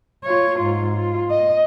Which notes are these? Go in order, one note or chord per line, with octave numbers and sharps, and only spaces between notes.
F4 C#5
G#2 F4
F4
D#5